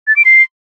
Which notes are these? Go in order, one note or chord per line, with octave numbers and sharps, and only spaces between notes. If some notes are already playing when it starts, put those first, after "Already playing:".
A6
D7
C7